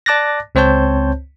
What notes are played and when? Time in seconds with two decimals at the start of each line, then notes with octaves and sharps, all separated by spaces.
0.06 D5 A5 D6 F#6 A6 A#6
0.55 C#2 C4 C5 C#5 A5 G6